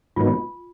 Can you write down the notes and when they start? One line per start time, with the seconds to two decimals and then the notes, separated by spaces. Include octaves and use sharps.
0.16 G#2 D#3 F#3 B3 D#4 F4